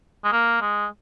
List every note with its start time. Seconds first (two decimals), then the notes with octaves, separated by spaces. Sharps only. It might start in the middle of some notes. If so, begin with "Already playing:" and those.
0.24 G#3
0.32 A#3
0.61 G#3